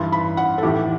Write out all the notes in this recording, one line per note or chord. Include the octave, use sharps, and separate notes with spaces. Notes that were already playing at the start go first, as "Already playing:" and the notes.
Already playing: G2 E3 C6
B5
F#5
A4
A2 E3 G4